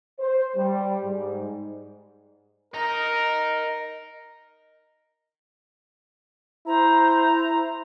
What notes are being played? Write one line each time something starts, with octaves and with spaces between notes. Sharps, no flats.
C5
G3
G#2
A#4 D#5 A#5
E4 C5 A#5